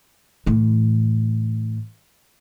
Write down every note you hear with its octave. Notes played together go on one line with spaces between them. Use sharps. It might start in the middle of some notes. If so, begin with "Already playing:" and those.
A2 E3